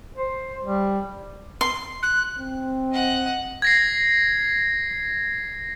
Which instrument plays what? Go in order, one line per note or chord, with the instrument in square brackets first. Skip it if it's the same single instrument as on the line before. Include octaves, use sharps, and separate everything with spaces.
[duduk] C5
G3
[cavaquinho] C6
[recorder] F#6
[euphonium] C4
[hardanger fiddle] D#5 F#5
[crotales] G#6 A#6 C7